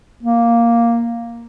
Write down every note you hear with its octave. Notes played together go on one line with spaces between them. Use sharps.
A#3